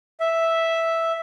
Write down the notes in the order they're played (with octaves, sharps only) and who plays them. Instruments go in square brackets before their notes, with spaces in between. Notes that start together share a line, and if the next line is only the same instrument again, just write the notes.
[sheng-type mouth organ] E5